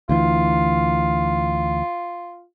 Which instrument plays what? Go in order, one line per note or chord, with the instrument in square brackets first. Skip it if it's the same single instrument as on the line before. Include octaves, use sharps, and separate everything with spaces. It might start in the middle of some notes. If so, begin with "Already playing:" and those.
[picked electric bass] D2 E3 [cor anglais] F4